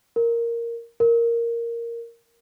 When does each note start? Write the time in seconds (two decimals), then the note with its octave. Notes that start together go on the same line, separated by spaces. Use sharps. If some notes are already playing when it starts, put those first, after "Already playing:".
0.16 A#4
1.00 A#4